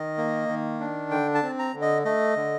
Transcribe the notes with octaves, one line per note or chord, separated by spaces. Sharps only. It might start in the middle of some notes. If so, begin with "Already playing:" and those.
Already playing: D#3 D#5
A#3
D#3
D4
D3 G5
A5
C4
A#5
D3
D#5
A3 D#5
D3